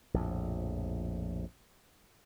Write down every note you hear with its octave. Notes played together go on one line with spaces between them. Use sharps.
A#1 F2 A2